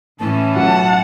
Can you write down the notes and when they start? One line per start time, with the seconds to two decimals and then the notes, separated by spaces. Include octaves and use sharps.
0.20 A2 E3 C#4 A5
0.56 B1 F#3 F#5